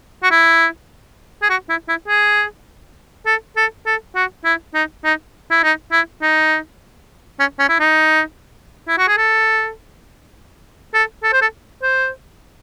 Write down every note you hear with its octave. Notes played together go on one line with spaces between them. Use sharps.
F#4
E4
G#4
F#4
E4
E4
G#4
A4
A4
A4
F#4
E4
D#4
D#4
E4
D#4
E4
D#4
C#4
C#4
E4
D#4
E4
F#4
G#4
A4
A4
A4
C5
A4
C5